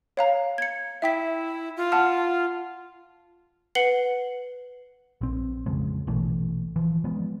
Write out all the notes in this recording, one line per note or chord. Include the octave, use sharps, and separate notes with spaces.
C#5 F5 A#5
G#6 C#7
E4 E5 G5 B6
F4
F#5 A5 F6
B4 F#5 C7 C#7 F#7 G7
A#1 C4
F2 C#3 F3 G#3
A#1 B2 E3 A3
E3 F3
F3 G#3 B3